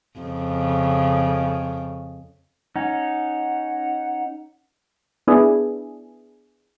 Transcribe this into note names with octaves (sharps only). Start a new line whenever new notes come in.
F2 C#3
C#4 D#4 F#5
B3 D4 E4 G#4